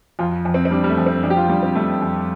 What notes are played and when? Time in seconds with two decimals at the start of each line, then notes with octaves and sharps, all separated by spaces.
0.19 F2 F4
0.45 F2
0.54 C4
0.65 C4
0.71 G3 D4
0.84 G3
0.89 A3
0.98 F2
1.06 C4
1.23 F2 D4
1.30 G4
1.37 F4
1.49 G3 D4
1.63 C4
1.75 G3 A3
2.02 F2